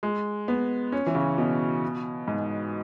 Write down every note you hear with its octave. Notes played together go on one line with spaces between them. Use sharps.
G#3
B3
C#4
E3
C#3
B2
G#2